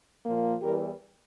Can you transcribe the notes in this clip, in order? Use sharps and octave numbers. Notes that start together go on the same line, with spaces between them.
A#2 F3 A#3
E2 E3 G3 G4 A#4